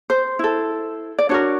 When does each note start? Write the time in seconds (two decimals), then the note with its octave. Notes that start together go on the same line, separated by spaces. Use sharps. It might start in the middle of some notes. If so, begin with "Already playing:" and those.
0.10 C5
0.39 E4 A4
1.19 D5
1.29 D4 F#4 A#4 C#5